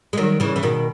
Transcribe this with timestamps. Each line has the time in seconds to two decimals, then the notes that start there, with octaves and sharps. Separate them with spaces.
0.13 G#3
0.18 D#3 F#3
0.40 C#3 E3
0.56 E3
0.63 B2 D#3